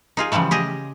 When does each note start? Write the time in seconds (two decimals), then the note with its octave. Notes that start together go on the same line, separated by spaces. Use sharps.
0.17 D#4 F4 G#4
0.32 C#3 E3 F3 G3 A3
0.51 G4 G#4 D#5